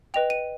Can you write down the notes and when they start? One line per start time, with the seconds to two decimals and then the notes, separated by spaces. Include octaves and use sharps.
0.14 B4 D#5 G5 F7
0.30 D#7